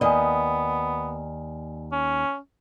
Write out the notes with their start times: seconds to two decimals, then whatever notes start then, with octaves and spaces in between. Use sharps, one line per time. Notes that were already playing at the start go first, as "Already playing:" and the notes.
0.01 D#2 B3 D5 D#5 G#5
1.92 C#4